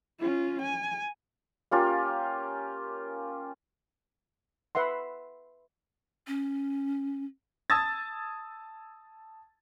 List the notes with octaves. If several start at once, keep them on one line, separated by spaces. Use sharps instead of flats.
C#4 F4
G#5
A#3 C#4 F4 G4
B4 E5 F#5 C6
C#4
A5 D#6 E6 G#6 A6